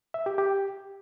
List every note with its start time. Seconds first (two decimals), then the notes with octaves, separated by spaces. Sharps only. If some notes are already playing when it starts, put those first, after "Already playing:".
0.14 E5
0.26 G4
0.38 G4